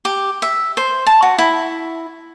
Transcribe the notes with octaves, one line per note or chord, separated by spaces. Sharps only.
G4
E5
C5
A5
F#4
E4